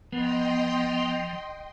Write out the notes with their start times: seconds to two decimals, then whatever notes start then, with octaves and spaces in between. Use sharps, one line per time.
0.12 F3 B3 D#5 G5 C6